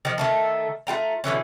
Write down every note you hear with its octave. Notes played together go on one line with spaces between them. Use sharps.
D#3 F3
D#3 A3 A4
A3 F4 G5 A#5
B2 D3 E3 C#4